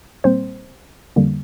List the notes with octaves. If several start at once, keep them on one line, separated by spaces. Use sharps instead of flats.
A#2 G3 A#3 C4 C5
F2 D3 G3 A#3